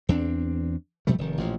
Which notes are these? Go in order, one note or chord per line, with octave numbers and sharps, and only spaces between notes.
E2 C4 D4
B2 F3 G3 A3
F1 D#3
A1 A#2 F3